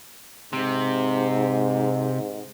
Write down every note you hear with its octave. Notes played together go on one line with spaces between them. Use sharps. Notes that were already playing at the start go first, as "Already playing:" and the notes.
G#2 C3